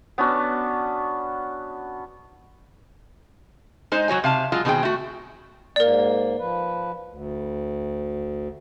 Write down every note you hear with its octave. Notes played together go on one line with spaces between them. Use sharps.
B3 C#4 D4 F#4
G#3 D#4 C5
F#3 F#4 C#5 G#5
C3 F5 A5
F#3 G#3 F4
B2 D#3 C4 G#4 G5
A3 F#4
G#2 A#3 A#4 D5
F3 B4
D2